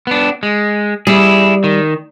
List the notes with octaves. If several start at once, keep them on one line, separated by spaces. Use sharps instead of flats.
B3 D4
G#3
G3 E4 G#4
D#3